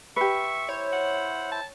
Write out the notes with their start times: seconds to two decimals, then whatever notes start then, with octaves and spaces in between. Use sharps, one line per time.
0.16 G4 B4 E5 C#6
0.69 E4 C5 C#5
0.93 F#5
1.52 A5